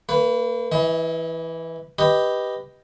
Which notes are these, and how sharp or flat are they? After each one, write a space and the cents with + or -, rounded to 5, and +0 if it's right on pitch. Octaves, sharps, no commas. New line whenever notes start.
A#3 -40 B4 +0
E3 -5 D#5 +40
G4 +0 B4 +0 D#5 +0